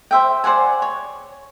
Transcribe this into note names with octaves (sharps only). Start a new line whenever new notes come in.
C5 E5 G5
C5 D5 F#5 G#5
C#5